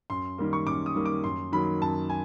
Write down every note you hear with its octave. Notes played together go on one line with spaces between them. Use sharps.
F#2 C6
D#3 G3 A#3
C#6
F#2 D6
D#6
D#3 G3 A#3
D6
F#2 C6
D#3 F#3 A#3 B5
F#2 A5
G#5